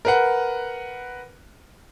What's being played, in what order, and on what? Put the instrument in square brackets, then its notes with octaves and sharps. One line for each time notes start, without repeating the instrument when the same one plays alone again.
[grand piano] A#4 B4 F#5